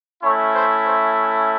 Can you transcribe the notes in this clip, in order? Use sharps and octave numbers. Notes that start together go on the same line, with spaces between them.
A3 C#4 E4 C#5
C5
C5